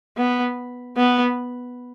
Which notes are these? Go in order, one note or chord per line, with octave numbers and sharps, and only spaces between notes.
B3
B3